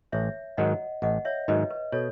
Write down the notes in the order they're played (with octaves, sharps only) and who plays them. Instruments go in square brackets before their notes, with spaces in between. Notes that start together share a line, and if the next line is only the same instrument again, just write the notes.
[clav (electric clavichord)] A1 [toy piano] C#5 E5
[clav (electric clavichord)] G#2 D#3 F#3 [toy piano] D#5 F#5
[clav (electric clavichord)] A1 [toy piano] D#5 F#5
[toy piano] C#5 E5
[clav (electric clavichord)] G#2 D#3 F#3 [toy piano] B4 D#5
[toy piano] B4
[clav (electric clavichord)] B2 [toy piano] A4 C#5